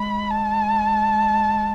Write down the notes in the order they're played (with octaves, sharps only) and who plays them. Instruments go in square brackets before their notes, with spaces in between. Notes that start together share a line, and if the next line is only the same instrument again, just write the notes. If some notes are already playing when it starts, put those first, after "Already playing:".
Already playing: [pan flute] G#3 [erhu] B5
[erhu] A5